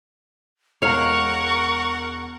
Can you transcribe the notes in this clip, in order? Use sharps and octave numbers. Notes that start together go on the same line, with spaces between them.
E1 G#3 A#4 C#5 F5 F#5 A#5 C#6